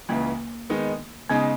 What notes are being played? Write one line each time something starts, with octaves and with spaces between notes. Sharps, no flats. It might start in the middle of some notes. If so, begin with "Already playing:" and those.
C#2 C#3 E3 A#3
D#3 G#3 B3 D#4
C#3 G#3 B3 D#4